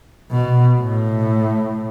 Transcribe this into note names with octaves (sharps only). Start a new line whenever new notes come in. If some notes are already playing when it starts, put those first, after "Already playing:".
B2
A2